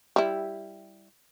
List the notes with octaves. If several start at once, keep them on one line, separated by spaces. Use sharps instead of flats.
G3 E4